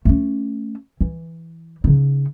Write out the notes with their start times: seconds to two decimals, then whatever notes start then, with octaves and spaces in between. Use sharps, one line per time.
0.05 A3 C#4
1.01 E3
1.84 C#3 D#4